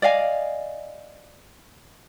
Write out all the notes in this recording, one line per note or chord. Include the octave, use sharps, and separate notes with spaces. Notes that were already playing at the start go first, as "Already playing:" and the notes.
D5 D#5 F5 G#5